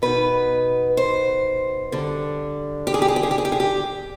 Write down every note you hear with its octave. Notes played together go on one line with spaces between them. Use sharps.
B2 B3 D#4 B4
C5
D3 G3 D4
G4
G#4
G4
G#4
G4
G#4
G4
G#4
G4
G#4
G4